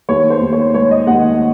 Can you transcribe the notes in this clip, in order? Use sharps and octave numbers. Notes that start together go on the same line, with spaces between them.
D#2 C#5
C5
D#2
C#5
G#3 C#5
D#5
D#2 F#5